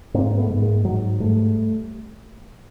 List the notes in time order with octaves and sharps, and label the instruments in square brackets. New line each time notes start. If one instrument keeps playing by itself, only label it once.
[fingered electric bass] G#2 A#3 C4
A3 B3
G#2
G#3 A#3
G#2 F#3 G#3
G#2 G3 A3